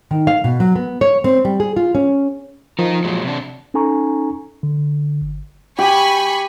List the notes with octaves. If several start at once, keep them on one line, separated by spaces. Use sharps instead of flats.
D#3
F5
B2
F#3
B3
C#5
C4
G3
G#4
F4
C#4
F3 D#4 A#4
A#2 F#3 G#3
C3 D4
C#4 D#4 A4 G#5 A#5 C#6
D3
G1
G4 G#5 B5 C#6